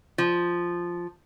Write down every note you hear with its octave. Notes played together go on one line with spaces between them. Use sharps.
F3